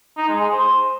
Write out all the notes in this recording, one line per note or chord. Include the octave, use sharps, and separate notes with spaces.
D#4
G#3
G#4
C5